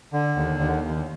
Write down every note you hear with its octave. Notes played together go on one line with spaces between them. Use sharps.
D3
D#2
D#2
D#2